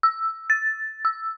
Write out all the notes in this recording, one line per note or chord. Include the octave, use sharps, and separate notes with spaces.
E6
A6
E6